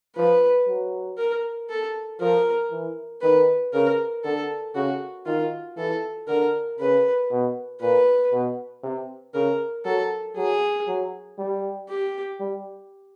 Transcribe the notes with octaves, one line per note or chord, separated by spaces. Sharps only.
F3 B4
F#3
A#4
A4
F3 A#4
E3
D#3 B4
C#3 A#4
D3 A4
C#3 F#4
D#3 F4
E3 A4
D3 A#4
C#3 B4
B2
A#2 B4
B2
C3
C#3 A#4
F#3 A4
F#3 G#4
F#3
G3
G4
G3